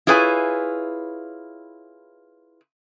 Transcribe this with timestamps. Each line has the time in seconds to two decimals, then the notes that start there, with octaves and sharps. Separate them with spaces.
0.07 E4 F4 G#4 B4 C#5 G#5